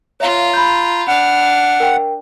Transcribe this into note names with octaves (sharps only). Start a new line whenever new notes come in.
F4 C#5 E5 F5 A#5
B5 G6
D4 F#5 F6
A#4 G5